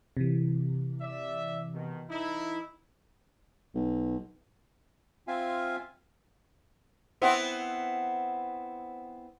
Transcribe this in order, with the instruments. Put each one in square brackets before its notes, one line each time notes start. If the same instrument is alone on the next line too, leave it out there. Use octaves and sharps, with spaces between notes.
[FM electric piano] C3 E3
[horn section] D5 E5
B2 D#3
E3 D#4 E4
[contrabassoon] B1
[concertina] C4 F4 E5 F5 G#5
[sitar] B3 C4 E4